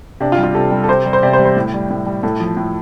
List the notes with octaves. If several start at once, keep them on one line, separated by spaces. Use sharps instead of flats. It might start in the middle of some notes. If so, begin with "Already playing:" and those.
C3 D4
F4
G3
F4
C3 A4
G3
A4
C3 C5
G3
C5
C3 D5
C5
G3
C5
A2
G3
A2
G3
A2 A4
F3
A2